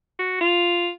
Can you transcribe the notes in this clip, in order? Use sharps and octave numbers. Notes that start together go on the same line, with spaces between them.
F#4
F4